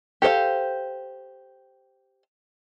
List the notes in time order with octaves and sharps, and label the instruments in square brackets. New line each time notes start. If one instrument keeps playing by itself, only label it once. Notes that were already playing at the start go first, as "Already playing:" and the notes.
[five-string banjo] G4 A4 C5 F5